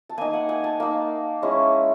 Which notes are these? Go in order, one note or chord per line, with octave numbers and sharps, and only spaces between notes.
A5
A#3 D#4 G#5
F#5
G#5
A5
A#3 D#4
G#3 C#4 E4